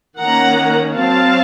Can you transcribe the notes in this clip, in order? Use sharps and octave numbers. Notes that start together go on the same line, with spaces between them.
D#3 A#3 C#4 F#5 A#5
F#3 C4 F5 A5